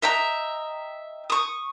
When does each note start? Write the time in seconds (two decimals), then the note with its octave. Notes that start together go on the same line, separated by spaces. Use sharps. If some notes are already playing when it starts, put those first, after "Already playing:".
0.02 D#5 E5 G5 A#5
1.30 C#6 D#6